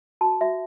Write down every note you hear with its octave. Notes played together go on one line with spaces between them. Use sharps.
F#4 A5
F#4 E5